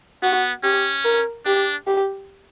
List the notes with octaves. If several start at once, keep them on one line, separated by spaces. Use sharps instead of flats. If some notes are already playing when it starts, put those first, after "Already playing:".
B3 F#4
C#4 G4
A#4
D4 G4
G4